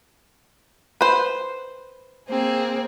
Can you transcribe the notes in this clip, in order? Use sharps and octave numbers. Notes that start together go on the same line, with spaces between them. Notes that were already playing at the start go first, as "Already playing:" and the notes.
B4 C5
A#3 C4 G#4